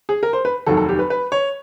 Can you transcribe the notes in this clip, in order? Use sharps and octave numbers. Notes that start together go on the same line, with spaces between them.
G#4
A#4
C5
B4
F1 D#2 D#3 F#3 A4
A4
G4
B4
B4
C#5